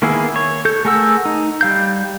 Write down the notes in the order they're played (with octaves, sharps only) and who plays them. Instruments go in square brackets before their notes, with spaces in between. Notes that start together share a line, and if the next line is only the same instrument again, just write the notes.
[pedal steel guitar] D#3 A#3 B3 E4 G#4
C#5
A4 G6
A3 G#4 A#4 F#5 E6
D#4
G3 F5 G6